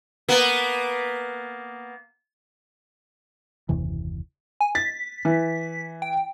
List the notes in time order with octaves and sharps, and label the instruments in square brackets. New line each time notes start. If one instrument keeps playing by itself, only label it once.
[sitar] A#3 B3
[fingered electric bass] F#1 D#2 C3 E3
[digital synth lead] G#5
[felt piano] A6 [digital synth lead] B6
[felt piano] E3
[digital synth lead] G5